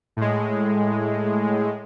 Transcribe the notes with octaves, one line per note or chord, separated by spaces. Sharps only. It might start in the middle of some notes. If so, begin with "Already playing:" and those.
A2 G#3